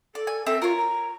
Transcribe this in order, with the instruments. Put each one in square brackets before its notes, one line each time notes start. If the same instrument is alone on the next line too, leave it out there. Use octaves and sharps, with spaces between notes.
[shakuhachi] A4 [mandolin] D5
[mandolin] G#5
[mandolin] C4 E5 [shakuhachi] A4
[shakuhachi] F4 [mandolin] A#4 C#5
[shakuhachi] A#5